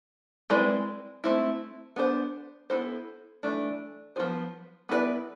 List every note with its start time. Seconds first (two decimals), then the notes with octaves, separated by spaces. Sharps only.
0.50 G#3 C4 E4 B4 D5
1.24 A3 C4 E4
1.96 B3 D4 A4 C5
2.70 B3 E4 A4 C5
3.43 E3 A3 D4
4.16 F3 B3 F4 G#4 C5
4.89 B3 E4 G#4 B4 D5